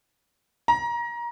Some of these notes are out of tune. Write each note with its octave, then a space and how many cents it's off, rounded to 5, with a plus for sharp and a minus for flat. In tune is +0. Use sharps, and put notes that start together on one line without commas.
A#5 +25